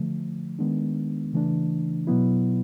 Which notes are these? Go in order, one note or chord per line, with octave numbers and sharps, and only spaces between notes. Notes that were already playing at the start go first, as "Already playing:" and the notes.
Already playing: D3 F3 A3
D#3 G#3 B3 D4
C#3 E3 A3 D4
B2 F#3 B3 E4